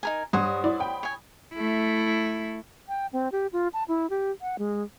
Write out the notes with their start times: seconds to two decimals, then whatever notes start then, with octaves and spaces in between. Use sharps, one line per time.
0.03 D#4 A#4 G#5
0.33 G2 C5 C#5 F#5 D#6
0.64 E4 D5
0.80 G5 B5
1.03 C#5 G#5
1.54 A3 E4
2.88 G5
3.13 C4
3.32 G4
3.53 F4
3.73 A5
3.88 E4
4.10 G4
4.41 F#5
4.59 G#3